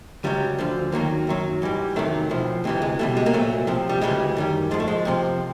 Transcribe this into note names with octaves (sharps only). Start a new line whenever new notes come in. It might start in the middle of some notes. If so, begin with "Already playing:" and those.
C#2 C#3 F#3 G3
D2 D3 F3
D#2 D#3 F#3 A#3
F#2 D#3 F#3
G#2 E3 G3
E2 C3 D#3 F#3 A3
B1 A2 F3
D2 C3 E3 G3 G#3
G#3
C#2 B2 G3 A3
G#3
A#3
C2 A#2 F#3 A3
C2 C3 F3
G3
D2 C#3 E3 G3 G#3
F#2 D#3 G3
G#2 F3 G#3
A3
G#3
F2 C3 F3